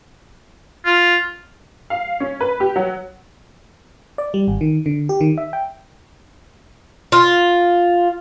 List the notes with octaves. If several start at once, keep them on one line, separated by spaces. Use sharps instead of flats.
F4
F5
C#4
B4
G4
F#3
D5
G3
G#1
D#3
D3
G4
D#3
E5
G5
F4